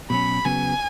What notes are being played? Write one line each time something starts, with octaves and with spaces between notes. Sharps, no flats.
B2 F#3 C#4 B5
C#3 F#3 B3 G#5